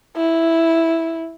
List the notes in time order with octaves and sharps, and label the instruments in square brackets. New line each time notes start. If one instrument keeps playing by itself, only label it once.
[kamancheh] E4